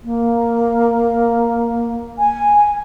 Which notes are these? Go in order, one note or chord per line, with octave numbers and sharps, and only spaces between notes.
A#3
G#5